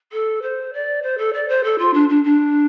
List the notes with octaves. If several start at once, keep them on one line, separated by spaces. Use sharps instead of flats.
A4
C5
D5
C5
A4
D5
C5
A4
F4
D4
D4
D4